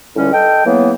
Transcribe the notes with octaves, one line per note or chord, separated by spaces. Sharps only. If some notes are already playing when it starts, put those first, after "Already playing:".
C#2 A2 D3 G3 C#4
A4 D#5 G5
C#3 E3 F#3 A#3 B3